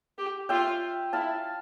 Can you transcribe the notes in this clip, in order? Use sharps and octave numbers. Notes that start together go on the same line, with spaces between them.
G4
F4 E5 G5
E4 F5 A5